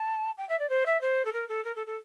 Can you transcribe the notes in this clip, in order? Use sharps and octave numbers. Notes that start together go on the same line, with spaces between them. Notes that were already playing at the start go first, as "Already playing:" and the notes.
Already playing: A5
G5
E5
D5
C5
E5
C5
A4
A#4
A4
A#4
A4
A4